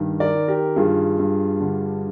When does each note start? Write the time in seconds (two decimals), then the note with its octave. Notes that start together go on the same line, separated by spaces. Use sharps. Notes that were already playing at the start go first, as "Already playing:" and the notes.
Already playing: G2 D#3
0.20 A#4 D5
0.35 D#3
0.48 G4 A#4
0.76 G2 F4 G#4
1.19 G2
1.61 D3